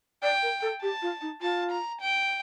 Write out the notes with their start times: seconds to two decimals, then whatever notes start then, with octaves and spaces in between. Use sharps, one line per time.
0.23 D5 G5
0.42 A#4
0.62 A4
0.82 G4 A5
1.02 F4
1.21 D#4
1.41 F4 A5
1.71 A#5
2.01 G5